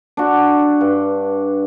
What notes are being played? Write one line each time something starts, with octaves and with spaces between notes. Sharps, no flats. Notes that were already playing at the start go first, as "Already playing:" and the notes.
D4 F#4
G2